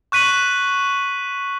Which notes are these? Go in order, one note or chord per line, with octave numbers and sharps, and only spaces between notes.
C#6 F#6 B6 D#7 F#7